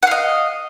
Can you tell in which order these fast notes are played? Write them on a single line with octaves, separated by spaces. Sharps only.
F#5 F5 D#5